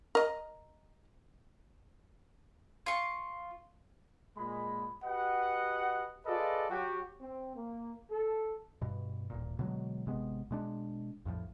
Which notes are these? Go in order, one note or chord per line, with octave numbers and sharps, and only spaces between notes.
A#4 D#5
F4 C#6
A#2 G#3 B5
F#4 G4 B4 D#5 F#5
F4 G#4 A4 B4 D5 D#5
F#3 F#4 G4
C4
A#3
A4
G2 B2
D#1 A1 A#2
B2 D3 F#3 G#3
G#1 C3 G#3 B3
B2 G#3 D4
A#1 F2 A2 F3